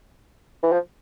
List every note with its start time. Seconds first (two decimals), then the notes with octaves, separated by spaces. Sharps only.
0.63 E3
0.72 F3